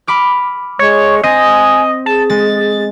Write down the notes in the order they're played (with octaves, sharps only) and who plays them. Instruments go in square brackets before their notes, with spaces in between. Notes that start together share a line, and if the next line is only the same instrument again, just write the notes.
[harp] B5 D6 F6
[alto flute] G#3 [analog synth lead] C#5
[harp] C4 [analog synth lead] D#5 [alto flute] G#5
[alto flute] G#4 [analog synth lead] A5
[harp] G#3 [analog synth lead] A6